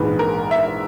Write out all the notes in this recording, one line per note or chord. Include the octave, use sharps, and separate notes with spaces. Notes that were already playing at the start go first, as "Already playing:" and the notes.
Already playing: A#1 G#2 E3 G#3 B4
A#4
E5